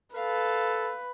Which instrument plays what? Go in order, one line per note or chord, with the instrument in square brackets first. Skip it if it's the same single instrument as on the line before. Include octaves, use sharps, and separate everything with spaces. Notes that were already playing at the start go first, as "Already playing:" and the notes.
[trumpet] A4 [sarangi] B4 [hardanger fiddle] F5